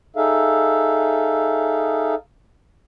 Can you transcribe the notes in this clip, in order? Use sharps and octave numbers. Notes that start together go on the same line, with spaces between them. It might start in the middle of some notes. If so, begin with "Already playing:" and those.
D#4 G#4 A4 E5 F5